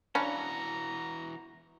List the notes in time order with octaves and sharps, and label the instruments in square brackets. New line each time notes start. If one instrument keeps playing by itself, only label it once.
[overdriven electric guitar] E3 F#4 [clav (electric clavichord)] C#4 [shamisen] D4 F5 B5 [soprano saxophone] A#5